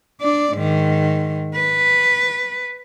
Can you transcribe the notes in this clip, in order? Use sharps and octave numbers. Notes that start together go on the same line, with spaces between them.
D4 D5
G#2 D#3
B4